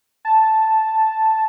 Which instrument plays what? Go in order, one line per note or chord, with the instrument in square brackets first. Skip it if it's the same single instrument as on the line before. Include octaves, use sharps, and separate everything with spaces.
[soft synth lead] A5